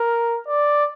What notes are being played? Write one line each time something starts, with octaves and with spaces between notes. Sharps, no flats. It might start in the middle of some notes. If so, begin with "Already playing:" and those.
Already playing: A#4
D5